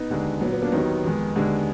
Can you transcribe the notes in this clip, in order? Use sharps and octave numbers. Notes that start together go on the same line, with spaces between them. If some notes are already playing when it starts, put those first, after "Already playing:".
Already playing: B3 D#4
D#2 D3 G#3
A#2 F#3 B3
B3
A#3 D4
D#2 D#3 F#3 B3 D#4
F2 D#3 G#3
D#2 D3 G#3